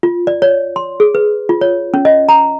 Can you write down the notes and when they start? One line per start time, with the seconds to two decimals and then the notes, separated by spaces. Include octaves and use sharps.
0.03 F4
0.27 D5
0.42 C#5
0.76 C6
1.00 G#4
1.15 B4
1.49 F4
1.61 C#5
1.94 C#4
2.05 D#5
2.29 A#5